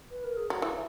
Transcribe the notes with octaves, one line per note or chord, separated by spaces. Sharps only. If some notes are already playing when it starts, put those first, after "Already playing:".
B4
A#4
G#4
F#3 F#4
E3 E4